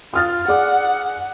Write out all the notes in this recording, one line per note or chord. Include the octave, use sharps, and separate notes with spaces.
F4 D#6 F6 A6
G#4 D5 F#5 D6